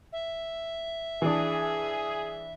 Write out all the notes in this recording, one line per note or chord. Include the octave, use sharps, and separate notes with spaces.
E5
E3 D4 G#4